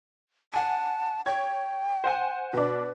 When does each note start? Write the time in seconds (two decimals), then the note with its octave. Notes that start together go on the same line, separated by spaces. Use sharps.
0.54 F#5 G#5 A5
1.26 C#5 G5 G#6
2.04 C5 F#5 G#5
2.53 B2 D4 B4